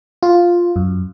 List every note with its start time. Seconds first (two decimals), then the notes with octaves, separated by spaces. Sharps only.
0.23 F4
0.76 F#2